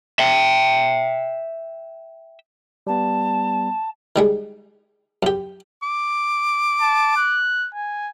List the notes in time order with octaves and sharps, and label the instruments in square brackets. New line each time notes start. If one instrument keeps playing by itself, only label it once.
[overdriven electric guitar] E5 G5
[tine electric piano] G3 B3 [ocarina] A5
[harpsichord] D#3 G3 G#3
F#2 G4
[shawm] D6
[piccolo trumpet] A5
F#6
G#5